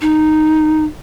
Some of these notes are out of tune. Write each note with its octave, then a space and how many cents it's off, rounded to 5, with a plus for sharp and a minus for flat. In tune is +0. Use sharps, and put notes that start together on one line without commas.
D#4 -10